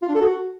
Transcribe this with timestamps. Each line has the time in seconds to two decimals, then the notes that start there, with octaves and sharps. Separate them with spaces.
0.02 F4
0.09 D4
0.15 A4
0.21 F#4